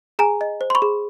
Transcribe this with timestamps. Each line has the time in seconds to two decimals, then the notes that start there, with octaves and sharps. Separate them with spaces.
0.19 G#4 G#5 A#5
0.41 D#5
0.61 C5
0.70 C6
0.75 B5 C#6
0.82 G#4